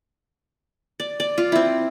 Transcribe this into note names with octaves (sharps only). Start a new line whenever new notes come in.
D5
D5
F4
C4 E4